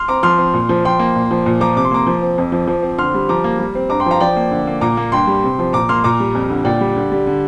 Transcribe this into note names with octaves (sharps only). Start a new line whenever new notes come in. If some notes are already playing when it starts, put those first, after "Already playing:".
Already playing: C6 F6
C4 A#5 D6
F3 C6 F6
C4
A#2
F3
F3 G5 C6
A#3
A#2
F3
A#2
F3 A#5 D6
C3 D6
C6
A#3 A#5 D6
F3
C4
F2
F3
F3
C4
D3 C6 F6
G3
F3 A#5 D6
A#3
G3
C4
G2 A#5 D6
G5 C6
F3 F5 A#5
F3 D5 G5
A#3
D3
A#3
A#2 A#5 D6
A#3
G2 G5 C6
G3
C3
F3
A#2 A#5 D6
A#3 C6 F6
A#2 A#5 D6
G3
F2
D3
A#2 D5 G5
G3
D3
G3
D3